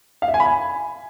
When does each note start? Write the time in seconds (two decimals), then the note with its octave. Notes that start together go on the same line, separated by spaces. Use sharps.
0.22 F5
0.28 E5
0.34 G#5
0.40 B5
0.46 G#5